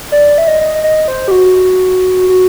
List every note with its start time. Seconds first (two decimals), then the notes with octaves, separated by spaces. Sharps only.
0.12 D5
0.38 E5
0.48 D#5
0.83 D#5
1.08 C5
1.28 G4
1.31 F#4
2.29 F#4